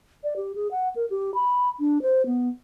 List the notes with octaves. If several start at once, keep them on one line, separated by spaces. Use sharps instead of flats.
D5
G4
G#4
F#5
A#4
G4
B5
D4
C5
B3